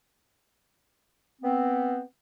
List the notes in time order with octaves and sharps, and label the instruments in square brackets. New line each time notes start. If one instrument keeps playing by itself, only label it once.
[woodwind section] B3 C4